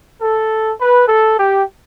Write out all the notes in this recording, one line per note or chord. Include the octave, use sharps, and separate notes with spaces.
A4
B4
A4
G4